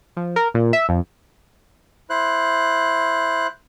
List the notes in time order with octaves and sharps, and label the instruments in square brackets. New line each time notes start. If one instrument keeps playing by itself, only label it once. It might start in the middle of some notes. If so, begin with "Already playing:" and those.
[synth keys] F3
A#4
A#2
E5
F2
[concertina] E4 C5 F#6